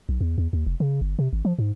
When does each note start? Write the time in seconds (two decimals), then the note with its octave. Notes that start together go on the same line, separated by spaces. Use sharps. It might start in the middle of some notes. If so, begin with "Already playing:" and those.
0.09 B1
0.21 E2
0.38 E2
0.53 D#2
0.66 F1
0.80 C#3
1.01 G1
1.19 C3
1.33 G#1
1.45 F3
1.59 G#2